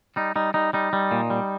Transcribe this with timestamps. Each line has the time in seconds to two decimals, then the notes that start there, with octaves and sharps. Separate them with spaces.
0.16 G3 D#4
0.36 G3 D#4
0.54 G3 D#4
0.73 G3 D#4
0.93 G3
1.12 A#2
1.30 G3